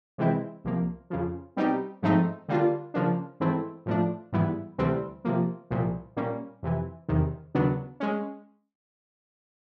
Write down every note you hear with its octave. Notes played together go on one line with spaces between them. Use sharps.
C3 E3 G#3 C4 E4
C2 C3 F3 A#3
F2 C#3 F3
B2 G3 C4 D#4 G4
G#2 F3 A3 C4 D#4
D3 G3 A#3 D4 F4
C#3 F3 A#3 D4
G#2 E3 A3 C4 E4
A2 F3 A3 D4
G#2 E3 G3 B3 E4
D2 C3 E3 G3 C4
C3 F3 A#3
C2 A#2 F3
A#2 G3 A#3 C#4
F2 C3 E3
E2 C3 D#3
D#2 C#3 F#3 B3 D4
G#3 C#4